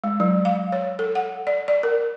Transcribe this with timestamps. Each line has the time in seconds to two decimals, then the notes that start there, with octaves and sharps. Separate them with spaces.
0.04 G#3
0.20 F#3
0.45 F5
0.72 C#5
0.99 A4
1.15 F#5
1.47 D5
1.68 D5
1.83 A#4